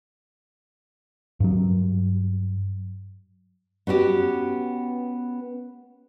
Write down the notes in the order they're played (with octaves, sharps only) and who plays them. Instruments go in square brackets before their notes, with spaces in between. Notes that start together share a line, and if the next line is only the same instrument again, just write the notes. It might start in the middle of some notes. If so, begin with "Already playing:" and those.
[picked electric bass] G2 F#3
[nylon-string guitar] B3 C#4 F#4 G4